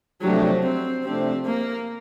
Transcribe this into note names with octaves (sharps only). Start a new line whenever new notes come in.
C3 F3 F#3 A3 D4 G4
C4
C3 F3 A3 C4 D4 G4
A#3